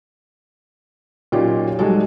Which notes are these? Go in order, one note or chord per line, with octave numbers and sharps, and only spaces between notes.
A#2 F#3 C#4 D#4 F4 G4
G3 G#3 D#4 F#4 A4